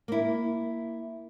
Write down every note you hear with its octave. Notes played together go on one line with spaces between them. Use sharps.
A#3 E4